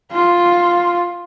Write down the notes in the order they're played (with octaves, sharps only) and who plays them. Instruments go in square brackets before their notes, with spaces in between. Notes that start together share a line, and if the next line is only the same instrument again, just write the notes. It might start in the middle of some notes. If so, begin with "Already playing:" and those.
[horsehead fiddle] F4